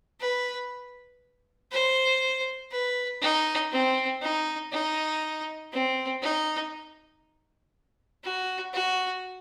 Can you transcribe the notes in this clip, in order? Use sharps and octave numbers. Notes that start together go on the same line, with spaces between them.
B4
C5
B4
D#4
C4
D#4
D#4
C4
D#4
F#4
F#4